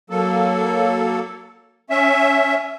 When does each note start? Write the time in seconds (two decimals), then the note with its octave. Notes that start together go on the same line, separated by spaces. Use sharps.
0.10 F#3 A#3 A4
1.90 C#4 E5